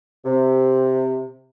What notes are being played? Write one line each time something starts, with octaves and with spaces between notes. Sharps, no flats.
C3